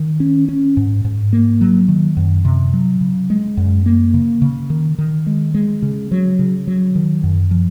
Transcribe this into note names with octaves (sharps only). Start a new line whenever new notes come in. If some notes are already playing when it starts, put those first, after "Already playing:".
Already playing: D#3
C#4
C#4
G#2
G#2
A#3
F#3
D#3
F#2
C3
F#3
C#3
G#3
F#2
A#3
C#3
C#3
D#3
D#3
G#3
G#3
C#3
F#3
C#3
F#3
D#3
F#2
F3